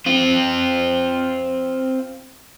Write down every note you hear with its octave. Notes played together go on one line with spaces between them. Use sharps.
C4 F4